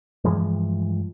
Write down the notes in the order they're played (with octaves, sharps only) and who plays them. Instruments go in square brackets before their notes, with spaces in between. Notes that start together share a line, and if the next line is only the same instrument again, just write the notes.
[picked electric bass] G2 E3 F3 G#3